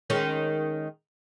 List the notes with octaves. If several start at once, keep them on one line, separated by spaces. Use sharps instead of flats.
D#3 G#3 C#4